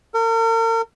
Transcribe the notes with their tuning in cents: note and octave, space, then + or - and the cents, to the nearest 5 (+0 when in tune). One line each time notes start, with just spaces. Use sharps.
A#4 -40